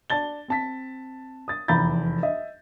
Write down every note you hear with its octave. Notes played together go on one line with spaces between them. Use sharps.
D4 A5 A6 G7
C4 A5 B6
D#6 A6
F1 E2 A#5 B5 G6 A6
D#5 E5